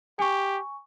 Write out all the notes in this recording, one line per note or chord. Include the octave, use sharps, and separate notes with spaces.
G4 G#5 C#6